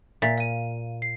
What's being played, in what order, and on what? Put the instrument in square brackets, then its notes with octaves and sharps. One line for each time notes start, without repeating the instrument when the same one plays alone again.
[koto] A#2 [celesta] E5 A6 B6
[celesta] F5 D#7
C7